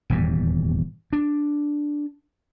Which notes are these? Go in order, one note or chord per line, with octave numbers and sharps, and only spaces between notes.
D#1 E2 G#2 G3
D4